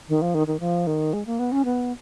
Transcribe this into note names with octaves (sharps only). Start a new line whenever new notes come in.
D#3
F3
D#3
D#3
F3
D#3
G#3
A#3
B3
C#4
B3